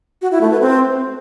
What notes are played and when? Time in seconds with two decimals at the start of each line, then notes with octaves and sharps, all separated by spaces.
0.22 F#4
0.31 E4
0.41 A3
0.51 B4
0.61 C4